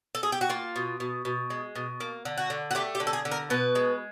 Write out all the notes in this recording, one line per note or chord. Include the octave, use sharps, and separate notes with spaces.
A4
G#4
G4
F#4
A#3 F4
B2
B2
B2
G#3
B2
A#3
D3
F#4
D3
F#4
A3 G4
G4
D3
A4
G#4
D3
A#4
B2 B4
G#3